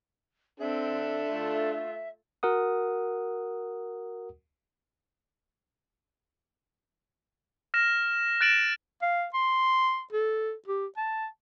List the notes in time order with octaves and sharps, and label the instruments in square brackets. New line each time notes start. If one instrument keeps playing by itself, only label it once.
[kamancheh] C4 [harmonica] D4 A4 [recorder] E5
[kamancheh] A3 F4
[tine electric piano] F#4 A#4 F#5 D#6
[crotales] F6 A#6 E7
F#6 A6 D7 E7 F#7
[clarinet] F5
C6
A4
G4
A5